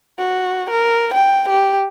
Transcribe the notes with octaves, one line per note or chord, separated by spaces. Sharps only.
F#4
A#4
G5
G4